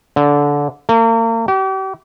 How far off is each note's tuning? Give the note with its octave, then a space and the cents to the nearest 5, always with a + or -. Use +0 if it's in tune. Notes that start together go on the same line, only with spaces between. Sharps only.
D3 -20
A#3 -40
G4 -40